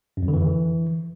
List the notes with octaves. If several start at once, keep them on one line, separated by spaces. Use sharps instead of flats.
F#2
F2
D3
E3